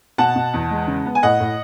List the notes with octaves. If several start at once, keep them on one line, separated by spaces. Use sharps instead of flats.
B2 F#5 A5
B2
E2
G#3
C#3
B3
G#5
A2 D#5 F#5
A2